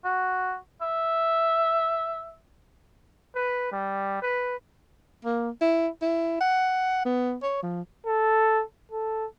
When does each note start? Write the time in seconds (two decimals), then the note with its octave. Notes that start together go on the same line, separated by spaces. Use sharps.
0.05 F#4
0.81 E5
3.35 B4
3.72 G3
4.22 B4
5.25 A#3
5.61 E4
6.02 E4
6.41 F#5
7.05 B3
7.42 C#5
7.63 F3
8.07 A4
8.92 A4